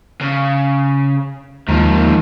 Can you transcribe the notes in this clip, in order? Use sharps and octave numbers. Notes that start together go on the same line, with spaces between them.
C#3
D#2 G#2 D#3 F3